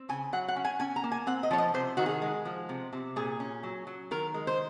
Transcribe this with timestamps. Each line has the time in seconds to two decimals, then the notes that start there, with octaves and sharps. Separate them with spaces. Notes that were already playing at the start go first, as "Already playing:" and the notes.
Already playing: C4
0.09 C#3 G#5
0.33 F#3 F#5
0.48 F#5
0.56 C#4
0.65 G#5
0.80 C#4 G#5
0.96 A#5
1.04 A#3
1.12 G#5
1.27 C4 F#5
1.43 D#5
1.51 F3 C#5
1.58 D#5
1.74 C3 C5
1.97 D#3 F#4
2.06 G#4
2.22 G#3
2.45 F3
2.69 C3
2.93 C3
3.16 A#2 G#4
3.40 C#4
3.63 F#3
3.87 F#3
4.11 D#3 A#4
4.34 G#3
4.47 C5